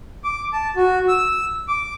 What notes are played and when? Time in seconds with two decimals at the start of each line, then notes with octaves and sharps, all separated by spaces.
0.24 D6
0.53 A5
0.76 F#4
1.08 E6
1.68 D6